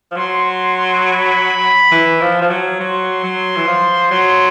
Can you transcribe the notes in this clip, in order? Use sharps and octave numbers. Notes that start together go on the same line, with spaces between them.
F3
F#3 C6
C6
C6
B5
E3
F3
F3
F#3
F#3 C6
F#3
E3
F3
F#3